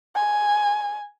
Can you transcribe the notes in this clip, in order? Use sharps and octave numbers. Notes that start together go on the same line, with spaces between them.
G#5